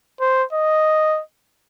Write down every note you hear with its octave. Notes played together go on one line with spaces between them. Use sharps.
C5
D#5